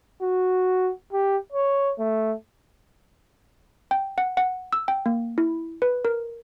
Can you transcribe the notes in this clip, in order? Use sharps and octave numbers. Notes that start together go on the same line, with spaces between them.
F#4
G4
C#5
A3
G5
F#5
F#5
E6
G5
A#3
E4
B4
A#4